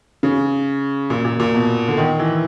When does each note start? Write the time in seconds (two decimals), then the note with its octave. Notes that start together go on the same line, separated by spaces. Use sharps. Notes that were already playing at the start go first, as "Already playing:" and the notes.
0.23 C#3
1.10 A#2
1.25 A#2
1.40 A#2
1.54 B2
1.88 D3
1.97 D#3
2.19 E3